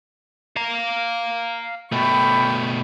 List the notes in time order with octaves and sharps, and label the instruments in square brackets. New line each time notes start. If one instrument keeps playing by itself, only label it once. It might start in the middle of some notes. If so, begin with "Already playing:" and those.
[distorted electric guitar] F5 A#5
[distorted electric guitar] B2 A3 [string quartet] G5 B5 C#6